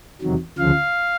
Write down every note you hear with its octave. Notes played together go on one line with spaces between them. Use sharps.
E2 C3 D#3 F#3
D2 C#3 F3 F5